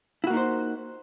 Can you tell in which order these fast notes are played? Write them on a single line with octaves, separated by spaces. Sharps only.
E4 F#4 A#3 D#4 C5